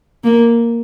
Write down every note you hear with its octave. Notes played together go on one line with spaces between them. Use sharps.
A#3